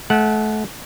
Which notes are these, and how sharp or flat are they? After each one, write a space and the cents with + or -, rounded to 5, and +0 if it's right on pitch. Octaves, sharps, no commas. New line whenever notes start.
A3 -30 F#5 -5